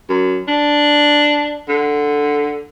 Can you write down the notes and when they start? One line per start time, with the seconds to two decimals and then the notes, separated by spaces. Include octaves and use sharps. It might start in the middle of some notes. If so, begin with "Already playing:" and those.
0.09 F#2
0.48 D4
1.69 D3